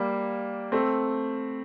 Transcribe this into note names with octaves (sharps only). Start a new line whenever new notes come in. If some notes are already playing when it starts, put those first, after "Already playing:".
Already playing: G3 A#3
A3 C4